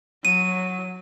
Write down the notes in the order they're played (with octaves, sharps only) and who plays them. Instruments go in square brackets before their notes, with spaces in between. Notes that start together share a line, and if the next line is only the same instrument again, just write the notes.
[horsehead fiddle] F#3 [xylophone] D#7